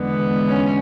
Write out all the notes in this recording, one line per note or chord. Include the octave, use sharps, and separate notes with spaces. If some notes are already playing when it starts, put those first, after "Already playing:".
Already playing: E2 D3 G#3 B3
C#4